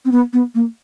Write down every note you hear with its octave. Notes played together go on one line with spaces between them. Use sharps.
C4
B3
B3
A#3